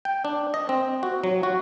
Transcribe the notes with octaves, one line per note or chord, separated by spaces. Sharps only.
G5
D4
D#5
C4
F#4
F#3
F#4